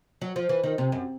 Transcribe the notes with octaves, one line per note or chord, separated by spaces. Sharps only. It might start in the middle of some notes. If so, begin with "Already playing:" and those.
F#3
F3
E3
D#3
C3
F#2